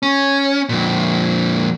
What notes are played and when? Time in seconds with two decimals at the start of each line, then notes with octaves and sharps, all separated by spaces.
0.03 C#4
0.69 F2 A#2